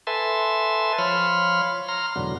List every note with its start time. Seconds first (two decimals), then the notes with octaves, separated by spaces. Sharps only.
0.07 A4 B4 E5 G#5 A5 C6
0.98 F3 C#5 B5 C6 F6
1.88 A#5 C6 F6
2.16 E2 G#2 B2 D3 F#3